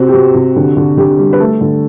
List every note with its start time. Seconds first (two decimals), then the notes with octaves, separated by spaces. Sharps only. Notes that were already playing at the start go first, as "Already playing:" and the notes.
Already playing: C3 C4 F#4
0.09 G4
0.13 C3 F#4
0.34 C3
0.56 D3
0.77 D3
0.97 D3 G4
1.19 G3
1.33 B4
1.40 A3 A4
1.61 D3